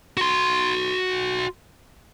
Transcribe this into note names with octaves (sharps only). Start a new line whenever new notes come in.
F#4 C6